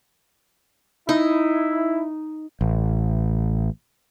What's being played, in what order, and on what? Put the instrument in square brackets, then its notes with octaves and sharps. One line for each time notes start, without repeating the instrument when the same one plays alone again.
[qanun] D#4 [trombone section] E4
[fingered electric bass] A1